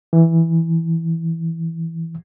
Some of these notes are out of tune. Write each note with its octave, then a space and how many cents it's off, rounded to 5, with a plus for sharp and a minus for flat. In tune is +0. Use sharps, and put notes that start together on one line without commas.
E3 -5